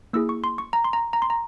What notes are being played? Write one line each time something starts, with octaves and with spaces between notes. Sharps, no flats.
A#3 E4 G#4 E6
C#6
C6
C#6
A#5
C6
A#5
A#5
C6
A#5